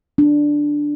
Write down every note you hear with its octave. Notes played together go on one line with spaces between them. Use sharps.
D4